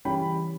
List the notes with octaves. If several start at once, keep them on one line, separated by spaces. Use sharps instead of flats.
C#3 E3 G3 C#4 E4 G5 B5